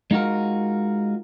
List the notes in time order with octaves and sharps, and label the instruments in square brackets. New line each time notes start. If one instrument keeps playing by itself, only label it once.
[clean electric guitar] G#3 D#4 F4 F#4 A#4